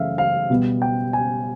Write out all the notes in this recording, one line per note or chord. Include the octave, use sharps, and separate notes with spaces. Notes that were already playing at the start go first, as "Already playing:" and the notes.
Already playing: F#2 C#3 E3 A3 E5 F5
F5
B2 G3 B3
G5
G#5